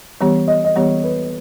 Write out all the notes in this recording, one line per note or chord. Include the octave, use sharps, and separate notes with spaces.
E3 G3 B3 G4 C#5
D#5
D#5
E3 G3 B3 G4 C#5
B4